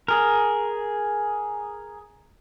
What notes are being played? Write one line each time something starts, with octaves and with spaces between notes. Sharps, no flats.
G#4 A#4